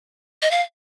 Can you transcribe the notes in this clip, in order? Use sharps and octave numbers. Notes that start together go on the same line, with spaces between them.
D#5
F5